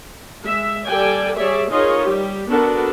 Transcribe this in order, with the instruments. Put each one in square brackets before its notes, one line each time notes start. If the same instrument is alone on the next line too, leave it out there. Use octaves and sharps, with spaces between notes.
[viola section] G#3 E5
G3 A4 D5 G5 G#5
G3 G#4 C#5 D5 E5
D#4 F4 G#4 A#4 C#5 D#5
G3 G4
B3 D4 F#4 A4 A#4